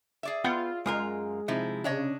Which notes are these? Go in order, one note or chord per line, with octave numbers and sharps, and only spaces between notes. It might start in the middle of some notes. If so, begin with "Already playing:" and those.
G#4 D5 E5
B3 F4 F#5 G5
F#2 G#3 F4 A#4
C3 F3 D#4 E4
C#3 D4 C#5 D#5